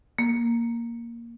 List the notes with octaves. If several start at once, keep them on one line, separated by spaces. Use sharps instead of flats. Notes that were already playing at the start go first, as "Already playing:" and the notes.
A#3